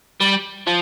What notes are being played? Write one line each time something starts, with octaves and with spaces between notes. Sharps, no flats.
G3
F3